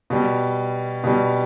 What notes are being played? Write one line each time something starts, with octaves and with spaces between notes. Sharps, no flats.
B2 G3
B2 G3